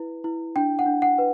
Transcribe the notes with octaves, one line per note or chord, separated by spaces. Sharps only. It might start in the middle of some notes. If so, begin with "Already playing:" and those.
Already playing: E4 B4
E4
D4 G5
F#5
D4
F#5
B4